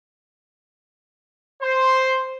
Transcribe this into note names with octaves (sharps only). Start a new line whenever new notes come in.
C5 C6